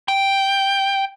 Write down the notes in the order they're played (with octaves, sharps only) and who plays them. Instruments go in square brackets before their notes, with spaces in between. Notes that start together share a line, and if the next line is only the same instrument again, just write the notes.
[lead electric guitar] G5